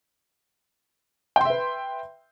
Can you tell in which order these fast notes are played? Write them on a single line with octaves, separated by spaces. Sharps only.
G5 C6 E5 B4